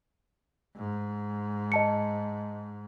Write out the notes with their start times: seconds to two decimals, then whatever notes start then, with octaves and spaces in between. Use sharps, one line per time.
0.77 G#2
1.72 D#5 A5 C#7